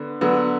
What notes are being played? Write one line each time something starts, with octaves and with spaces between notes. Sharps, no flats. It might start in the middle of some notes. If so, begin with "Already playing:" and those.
Already playing: D3 B3
D3 F#3 B3